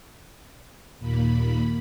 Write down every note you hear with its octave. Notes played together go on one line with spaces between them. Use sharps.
D#2 A#2 A#3 B5